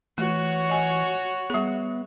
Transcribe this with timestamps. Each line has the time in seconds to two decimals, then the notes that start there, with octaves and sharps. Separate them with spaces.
0.18 E3 A3 F#4 C#5
0.69 D#5 G#5
1.50 G3 B3 G#4